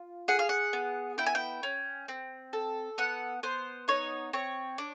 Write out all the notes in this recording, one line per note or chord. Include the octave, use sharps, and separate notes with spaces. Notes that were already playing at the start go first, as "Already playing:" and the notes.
Already playing: F4
G#4 F#5
F5
F#5
B3
E4 G5
G#5
G5
C#4
C4
A4
B3 F#5
B3 C5
D#4 C#5
C4 C#5
D4